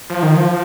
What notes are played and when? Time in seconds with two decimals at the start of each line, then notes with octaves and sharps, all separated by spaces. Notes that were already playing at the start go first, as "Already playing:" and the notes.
0.10 F3
0.23 D#3
0.36 F3